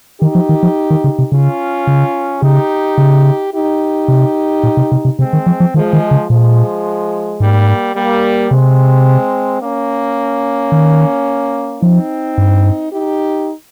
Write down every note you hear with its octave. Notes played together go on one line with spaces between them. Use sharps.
D#3 D#4 G4
F3
D#3
F3
D#3
C#3
C3
C#3 C#4 F4
C#3
C#3 D#4 G4
C#3
D#4 G4
C3
A#2
C3
C3
C3
C3 G#3 C4
D#3
F3
F3
D#3 F3 G#3
D#3
C#3
A#2 F3 G#3
G#2 G3 A#3
G3 A#3
C3 G#3 C4
A#3 C#4
D#3
F3 C4 D#4
G2
D#4 G4